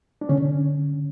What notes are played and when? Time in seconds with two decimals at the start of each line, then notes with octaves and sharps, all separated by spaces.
0.21 D4
0.29 D3 C#4